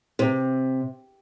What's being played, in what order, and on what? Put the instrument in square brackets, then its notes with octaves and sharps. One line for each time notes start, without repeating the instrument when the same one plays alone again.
[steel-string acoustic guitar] C3